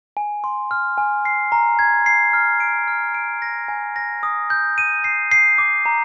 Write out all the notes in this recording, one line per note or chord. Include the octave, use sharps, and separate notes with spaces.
G#5
C6
F6
G#5
C7
A#5
G#6
C7
F6
D7
F6
D7
A#6
G#5
A#6
D#6
G6
D#7
C7
C7
D6
A#5